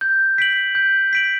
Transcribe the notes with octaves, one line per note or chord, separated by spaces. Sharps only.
G6
B6 D7 F#7
G6
B6 D7 F#7